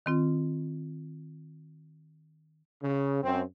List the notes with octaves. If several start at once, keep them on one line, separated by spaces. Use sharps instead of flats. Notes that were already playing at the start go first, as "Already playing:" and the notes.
D#3 C4 F4
C#3
F#2 C4